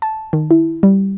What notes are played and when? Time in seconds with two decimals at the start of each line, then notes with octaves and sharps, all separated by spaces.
0.02 A5
0.33 D#3
0.51 E4
0.83 G3